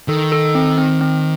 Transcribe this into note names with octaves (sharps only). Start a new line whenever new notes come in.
D#3 A4
A4
C4
C4
C4